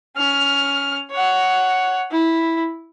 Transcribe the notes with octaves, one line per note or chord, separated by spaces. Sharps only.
C#4 F6
C#5 F#5
E4